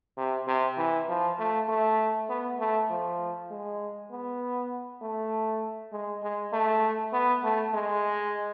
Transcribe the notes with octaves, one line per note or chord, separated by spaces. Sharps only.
C3
C3
E3
F3
A3
A3
B3
A3
F3
G#3
B3
A3
G#3
G#3
A3
B3
A3
G#3